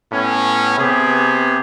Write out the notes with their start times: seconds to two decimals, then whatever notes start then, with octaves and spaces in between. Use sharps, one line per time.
0.12 A2 B3 C#4
0.78 C3 B3 G4 G#4